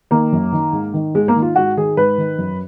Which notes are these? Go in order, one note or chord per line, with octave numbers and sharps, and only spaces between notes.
D#3 A#3
F#2
D#3
G#2
D#3
G#2 G#3
A#3
D#3
F4
G#2 F#4
D#3 G#4
G#2 B4
D#3
F#2